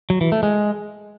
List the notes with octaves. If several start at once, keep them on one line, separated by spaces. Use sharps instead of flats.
F#3
E3
A3
G#3